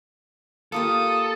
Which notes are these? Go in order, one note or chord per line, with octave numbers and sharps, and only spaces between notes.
A#3 F4 G4 A4 D#6